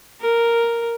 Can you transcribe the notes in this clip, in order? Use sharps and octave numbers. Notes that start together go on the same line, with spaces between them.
A#4